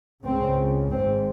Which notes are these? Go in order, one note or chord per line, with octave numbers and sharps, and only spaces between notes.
C#2 C#3 C4
G#1 G#2 C4